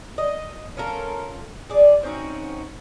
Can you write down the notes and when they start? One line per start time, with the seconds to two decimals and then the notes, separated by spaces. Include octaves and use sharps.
0.18 D#5
0.77 C#4 F4 A4 A#4
1.69 G#4 D5
2.03 C4 C#4 D#4 F#4